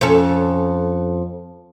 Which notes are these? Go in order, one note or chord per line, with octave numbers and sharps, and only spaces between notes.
F2 C#4 A4